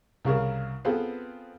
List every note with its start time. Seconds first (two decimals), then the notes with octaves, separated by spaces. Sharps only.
0.25 C2 C#3 G#4 A#4
0.85 B3 C4 F4 G#4 A4 B4